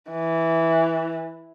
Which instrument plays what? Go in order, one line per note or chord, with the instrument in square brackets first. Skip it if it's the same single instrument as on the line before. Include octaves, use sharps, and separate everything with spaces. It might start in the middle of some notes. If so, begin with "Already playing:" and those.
[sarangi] E3